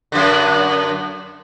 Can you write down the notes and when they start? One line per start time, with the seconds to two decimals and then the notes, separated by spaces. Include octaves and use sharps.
0.12 F#2 D3